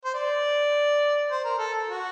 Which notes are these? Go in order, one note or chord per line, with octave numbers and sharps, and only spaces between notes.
C5
D5
C5
A#4
A4
F#4